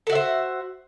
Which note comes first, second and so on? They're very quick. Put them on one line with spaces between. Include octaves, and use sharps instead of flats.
A4 F#4 E5 C5